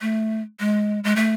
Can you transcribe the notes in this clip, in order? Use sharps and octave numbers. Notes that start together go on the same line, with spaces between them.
A3
G#3
G#3
A3